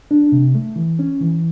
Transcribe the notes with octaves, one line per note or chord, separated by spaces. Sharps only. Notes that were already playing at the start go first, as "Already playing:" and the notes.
D4
C3
A3
E3
C#4
E3